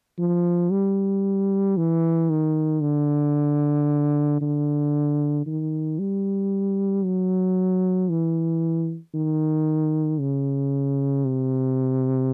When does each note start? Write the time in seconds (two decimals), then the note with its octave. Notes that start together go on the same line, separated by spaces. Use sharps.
0.19 F3
0.71 G3
1.77 E3
2.30 D#3
2.82 D3
4.41 D3
5.47 D#3
5.99 G3
7.04 F#3
8.09 E3
9.14 D#3
10.20 C#3
11.25 C3